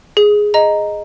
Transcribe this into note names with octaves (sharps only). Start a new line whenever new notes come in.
G#4
D#5 A#5